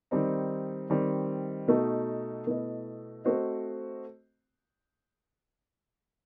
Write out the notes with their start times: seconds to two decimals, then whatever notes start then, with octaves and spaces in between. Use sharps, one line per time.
0.11 D#3 G3 C4 D#4
0.90 D#3 G3 C4
1.68 B2 A3 D#4 F#4
2.46 B2 A3 E4 B4 D#5
3.25 A3 C4 F#4 C5 D#5